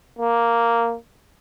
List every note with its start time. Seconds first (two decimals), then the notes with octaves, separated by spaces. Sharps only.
0.19 A#3